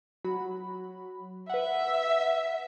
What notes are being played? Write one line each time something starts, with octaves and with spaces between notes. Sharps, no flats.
F#3 F#4 B5
B4 E5 F#5